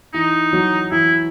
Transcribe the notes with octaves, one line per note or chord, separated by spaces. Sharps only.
E3 D#4
F#3
E3 E4